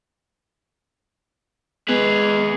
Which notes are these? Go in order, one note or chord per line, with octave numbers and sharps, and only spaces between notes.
G#3 B3 G#4 B4